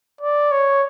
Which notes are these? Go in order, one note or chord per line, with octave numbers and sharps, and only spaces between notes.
D5
C#5